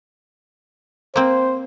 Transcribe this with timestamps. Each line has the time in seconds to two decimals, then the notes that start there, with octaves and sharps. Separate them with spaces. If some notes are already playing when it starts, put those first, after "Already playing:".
1.16 A#3 C4 C5